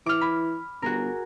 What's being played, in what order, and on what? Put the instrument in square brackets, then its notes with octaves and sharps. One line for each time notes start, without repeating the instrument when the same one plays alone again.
[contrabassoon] E3 [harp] D6 F6
[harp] B5
[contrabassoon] G1 [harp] F#4 G#4 A#4